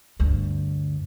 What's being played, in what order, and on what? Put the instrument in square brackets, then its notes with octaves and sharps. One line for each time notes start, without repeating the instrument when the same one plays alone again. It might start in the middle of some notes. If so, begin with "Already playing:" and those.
[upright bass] D2 G2